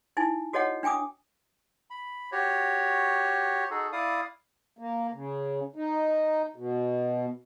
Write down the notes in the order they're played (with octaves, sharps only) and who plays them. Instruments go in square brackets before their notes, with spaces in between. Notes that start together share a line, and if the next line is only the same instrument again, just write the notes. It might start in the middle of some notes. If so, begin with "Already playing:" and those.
[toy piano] D#4 E4 G#5
F#4 A4 C#5 D#5 F#5
D4 G5 G#5 D6 D#6
[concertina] B5
F#4 G4 C#5
D#4 F#4 G#4 A4
E4 D5 F5 D#6
[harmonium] A#3
C#3
D#4
B2